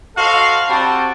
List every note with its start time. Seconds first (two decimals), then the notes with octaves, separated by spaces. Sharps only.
0.16 F#4 A4 C5 D#5 F5
0.69 G3 C4 F#4 G5 A5